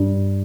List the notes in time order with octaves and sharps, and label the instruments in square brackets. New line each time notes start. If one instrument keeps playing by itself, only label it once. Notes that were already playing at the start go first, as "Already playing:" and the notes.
Already playing: [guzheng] G2